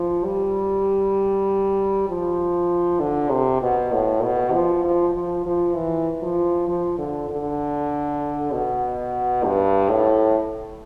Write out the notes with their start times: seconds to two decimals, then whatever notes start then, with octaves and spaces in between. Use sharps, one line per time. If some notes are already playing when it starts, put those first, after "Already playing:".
Already playing: F3
0.24 G3
2.09 F3
3.00 D3
3.31 C3
3.62 B2
3.92 A2
4.22 B2
4.53 F3
4.84 F3
5.14 F3
5.45 F3
5.75 E3
6.22 F3
6.68 F3
6.98 D3
7.30 D3
8.52 B2
9.44 G2
9.90 A2